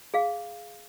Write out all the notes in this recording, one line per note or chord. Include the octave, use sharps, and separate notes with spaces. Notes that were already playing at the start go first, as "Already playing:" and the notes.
G#4 F5